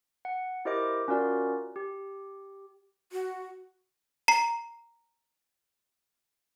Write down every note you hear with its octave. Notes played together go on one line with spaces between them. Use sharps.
F#5
E4 G4 A#4 C5 D#5 D6
C#4 F4 F#4 A#4 D5
G4
F#4
A#5 C7